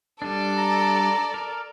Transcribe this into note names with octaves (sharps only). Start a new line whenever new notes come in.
G3 D4 A4 D5
A#5
A#4